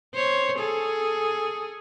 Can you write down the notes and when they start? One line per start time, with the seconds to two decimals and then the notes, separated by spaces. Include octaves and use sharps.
0.15 C5 C#5
0.59 G#4 A4